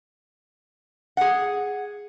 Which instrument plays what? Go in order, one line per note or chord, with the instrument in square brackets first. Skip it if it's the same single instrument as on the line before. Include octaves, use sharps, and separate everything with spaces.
[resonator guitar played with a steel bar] G#4 F#5